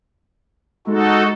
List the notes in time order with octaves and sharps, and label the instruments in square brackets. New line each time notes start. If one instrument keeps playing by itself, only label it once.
[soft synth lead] G#3 [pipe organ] D#4 F#4 A4